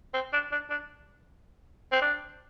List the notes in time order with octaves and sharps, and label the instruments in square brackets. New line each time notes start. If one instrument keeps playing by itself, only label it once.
[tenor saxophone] C4
D4
D4
D4
C4
D4